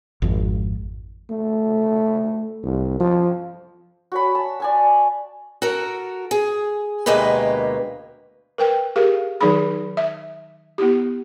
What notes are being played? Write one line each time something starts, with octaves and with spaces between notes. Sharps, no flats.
G#1 F2
A3
C2
F3
F#4 C#5 B5
A5
D5 G#5 A5
F#4 A4 A#4
G#4
D2 B2 G#3 A#3 G4 B4
A#4 B4 G5
G4 G#4 A#4 F5
D#3 F#3 D#4 G#4 B5
E5
B3 E4 G4